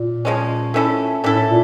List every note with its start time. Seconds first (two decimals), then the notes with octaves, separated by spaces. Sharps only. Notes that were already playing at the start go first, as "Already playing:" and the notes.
Already playing: A#2
0.25 C#3 F3 G#3 C#4
0.74 A3 C#4 E4 A4
1.24 A2 A3 C#4 E4 A4
1.48 A#2